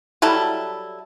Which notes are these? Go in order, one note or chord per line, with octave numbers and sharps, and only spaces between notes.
F#3 G3 E4 A4